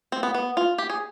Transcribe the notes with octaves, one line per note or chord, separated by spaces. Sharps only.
C4
B3
B3
F4
G4
G#4